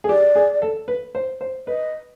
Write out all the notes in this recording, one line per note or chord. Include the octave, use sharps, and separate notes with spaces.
G#4
G4 D5
G#4
A4
B4
C5
C5
B4 D#5